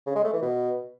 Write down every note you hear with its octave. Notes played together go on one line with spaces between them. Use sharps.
C#3
G#3
A3
E3
B2